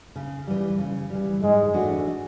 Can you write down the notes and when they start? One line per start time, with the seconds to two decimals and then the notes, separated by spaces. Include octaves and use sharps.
0.16 C#3
0.47 E3 G3
0.79 C#3
1.10 E3 G3
1.42 G#2 G#3
1.74 E3 A3 D4 F#4